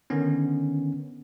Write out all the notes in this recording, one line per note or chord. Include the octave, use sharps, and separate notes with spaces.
D3 D#3 B3 C#4